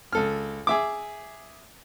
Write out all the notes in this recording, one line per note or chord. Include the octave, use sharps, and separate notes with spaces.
C#2 A4 F6
G#4 E5 D6